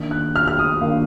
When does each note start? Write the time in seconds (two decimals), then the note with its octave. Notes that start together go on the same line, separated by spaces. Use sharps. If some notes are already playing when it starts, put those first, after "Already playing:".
Already playing: D#3 A#3 D4
0.11 F#6
0.36 F6
0.48 F6
0.59 D#6
0.81 D#3 A#3 D4 F5